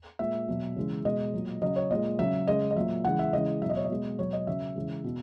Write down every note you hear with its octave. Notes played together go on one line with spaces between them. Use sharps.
A#2 G#3 E5
B2 F#3
C#3 E3 G#3
B2 G#3 D#5
A#2 F#3
C#3 F#3 D#5
C#5
A#2 G#3 D#5
C#3 F#3 E5
C#3 G#3 D#5
D#5
A#2 F#3 E5
C#3 E3 G#3 F#5
E5
C#3 E3 G#3 D#5
B2 F#3 E5
D#5
C#5
D#5
B2 G#3
B2 F#3 C#5
D#5
C#3 F#3 E5
C#3 E3 G#3
B2